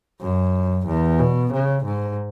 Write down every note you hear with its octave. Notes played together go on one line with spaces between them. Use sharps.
F#2
E2
B2
C#3
G#2